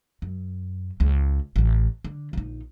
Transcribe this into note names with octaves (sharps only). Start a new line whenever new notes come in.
F#2
C#2 C#3
A1 A2
D3
A#1 D#4